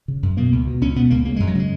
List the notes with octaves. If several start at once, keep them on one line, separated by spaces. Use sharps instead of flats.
C#3
F#2
B2 A#3
C#2
B2
C#2 C#4
B2 B3
C#2 A#3
C#3 A#3
F#2 G#3
F#3
C#3 G#3